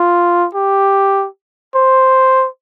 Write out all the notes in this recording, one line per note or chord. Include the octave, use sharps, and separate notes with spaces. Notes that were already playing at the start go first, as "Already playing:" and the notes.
Already playing: F4
G4
C5